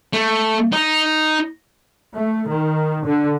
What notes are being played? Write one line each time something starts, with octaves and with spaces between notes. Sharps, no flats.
A3
D#4
A3
D#3
D3